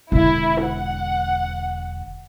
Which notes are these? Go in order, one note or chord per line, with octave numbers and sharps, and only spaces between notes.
E1 D3 E4
F#5